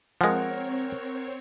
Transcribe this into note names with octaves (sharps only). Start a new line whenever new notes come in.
F3 G#3 C4 A#4 C#5 F#5